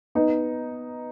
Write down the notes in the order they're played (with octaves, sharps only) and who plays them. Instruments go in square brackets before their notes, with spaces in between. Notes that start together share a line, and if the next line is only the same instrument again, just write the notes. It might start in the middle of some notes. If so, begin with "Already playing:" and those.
[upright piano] B3 D#4